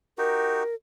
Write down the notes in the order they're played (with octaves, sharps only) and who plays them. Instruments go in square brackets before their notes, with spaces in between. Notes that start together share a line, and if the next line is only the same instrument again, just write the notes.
[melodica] D#4 F#4 G4 [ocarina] A#4